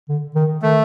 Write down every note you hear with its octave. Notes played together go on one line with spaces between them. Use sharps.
D3
D#3
D#3 A3